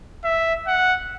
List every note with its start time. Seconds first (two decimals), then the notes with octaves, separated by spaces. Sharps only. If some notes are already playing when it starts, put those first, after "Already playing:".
0.24 E5
0.67 F#5